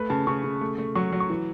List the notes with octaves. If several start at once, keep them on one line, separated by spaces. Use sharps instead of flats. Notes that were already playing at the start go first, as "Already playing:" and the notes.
Already playing: A3 B4
C#3 A5
C#3 C#6
C#3
A3
A3
F#3 C#6
F#3
C#6
E3